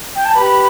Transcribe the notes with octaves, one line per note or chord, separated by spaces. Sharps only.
G5
A5
G4 B4 B5